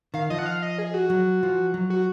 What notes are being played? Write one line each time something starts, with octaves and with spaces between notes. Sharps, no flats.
D#3 F5
F3 D#5
F#5
F5
D#5
G#4
F#4
F#3
F3
F#3
F#4